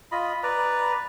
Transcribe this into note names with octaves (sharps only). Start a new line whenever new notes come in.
F4 D#5 B5
B4 D5 A#5